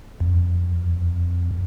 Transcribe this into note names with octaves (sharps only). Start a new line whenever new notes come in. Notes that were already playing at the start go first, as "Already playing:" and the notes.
F2